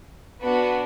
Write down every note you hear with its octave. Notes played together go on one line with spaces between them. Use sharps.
B3 D4 F#4 B4